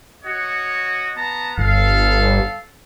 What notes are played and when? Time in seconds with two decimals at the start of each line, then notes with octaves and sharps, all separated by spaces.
0.24 F#4 C#5 D#5
1.17 B3 A5 A#5
1.58 G1 A4 F5